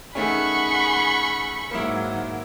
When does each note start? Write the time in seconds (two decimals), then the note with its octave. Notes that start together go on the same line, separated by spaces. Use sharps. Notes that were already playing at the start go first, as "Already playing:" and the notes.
0.15 D#3 A3 C#4 G#4 F#5 B5 C#6
1.71 G#2 D#3 F#3 A#3 E4